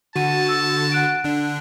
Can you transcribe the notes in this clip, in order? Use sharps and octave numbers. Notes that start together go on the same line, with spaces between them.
D3 F#4 F#5 A5 D#7
E6
F#5 F#6 D7
D3 D4